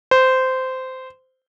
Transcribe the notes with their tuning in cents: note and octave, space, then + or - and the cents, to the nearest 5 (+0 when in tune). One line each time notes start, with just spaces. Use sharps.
C5 -15